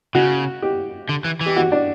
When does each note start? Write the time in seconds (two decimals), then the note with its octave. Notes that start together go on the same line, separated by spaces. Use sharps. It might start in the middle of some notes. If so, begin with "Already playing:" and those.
0.15 C#3 F#4
0.62 G4
1.09 D3
1.25 E3
1.41 E3
1.46 G4
1.57 F#4
1.72 D4